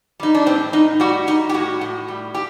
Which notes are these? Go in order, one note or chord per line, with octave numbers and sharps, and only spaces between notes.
G3 D#4
D4
A2 C4
A2 D#4
G3 F#4
G3 D#4
G4
A2 F#4
A2
G3
G4